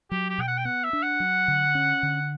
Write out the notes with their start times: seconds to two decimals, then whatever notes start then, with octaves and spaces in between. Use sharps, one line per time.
0.11 F#3 G4
0.29 G4
0.38 B2 G5
0.48 F#5
0.57 G5
0.65 B3 F#5
0.84 E5
0.93 D4
1.03 F#5
1.20 F#3
1.48 D3
1.75 C#4
2.03 D3